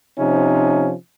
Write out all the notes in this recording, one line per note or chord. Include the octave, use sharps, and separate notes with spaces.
C3 F3 C#4 D#4